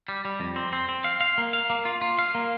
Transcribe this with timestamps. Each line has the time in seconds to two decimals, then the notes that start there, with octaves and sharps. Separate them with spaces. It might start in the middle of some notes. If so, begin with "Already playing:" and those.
0.09 G3
0.25 G3
0.40 F2
0.56 C4
0.73 C4
0.89 C4
1.04 F5
1.21 F5
1.38 A#3
1.53 F5
1.70 A#3
1.85 F4
2.02 F4
2.19 F5
2.35 A#3